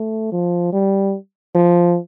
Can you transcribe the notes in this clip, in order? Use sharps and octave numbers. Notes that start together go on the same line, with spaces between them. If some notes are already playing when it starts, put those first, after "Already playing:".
Already playing: A3
F3
G3
F3